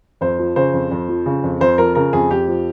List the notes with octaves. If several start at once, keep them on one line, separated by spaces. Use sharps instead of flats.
F2 C5
F3
C#3 C5
F2
F2
F3
C#3
F2
F2 C5
F3 A#4
C#3 A#4
F2 G#4
F2 G4
F3